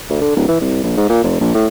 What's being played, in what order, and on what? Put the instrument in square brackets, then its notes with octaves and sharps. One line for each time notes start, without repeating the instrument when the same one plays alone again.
[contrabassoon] D2
D3
D1
E3
C2
A#1
G#2
A#2
F1
A#1
A2